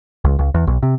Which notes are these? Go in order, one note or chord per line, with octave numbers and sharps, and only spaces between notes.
C#2
C#2
E2
B1
C3